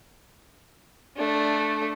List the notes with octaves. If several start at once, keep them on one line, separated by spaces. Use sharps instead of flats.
A3 D4